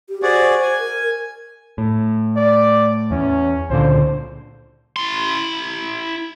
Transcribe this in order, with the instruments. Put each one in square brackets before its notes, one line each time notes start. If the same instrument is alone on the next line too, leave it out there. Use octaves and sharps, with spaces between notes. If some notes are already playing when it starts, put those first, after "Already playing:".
[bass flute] G4
[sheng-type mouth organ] F#4 G#4 D5 [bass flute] C5
[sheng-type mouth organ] G#5
[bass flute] A#4
[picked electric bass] A2
[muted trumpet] D5
[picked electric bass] E2 [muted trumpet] C#4
[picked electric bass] C#2 A#2 D3 [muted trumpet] C5
[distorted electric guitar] E4 C6